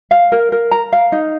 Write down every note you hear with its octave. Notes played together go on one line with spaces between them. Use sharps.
F5
A#4
A#4
A#5
F5
D#4